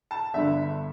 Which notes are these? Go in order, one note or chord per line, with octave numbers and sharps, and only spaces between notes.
A5
G1 G2 D3 E5